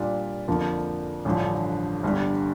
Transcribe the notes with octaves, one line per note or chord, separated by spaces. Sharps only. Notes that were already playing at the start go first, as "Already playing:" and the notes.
Already playing: A#2 G3 D4 F4
F2 D3 F3 A#3
A1 G2 D3 F3
G1 G2 D3 G3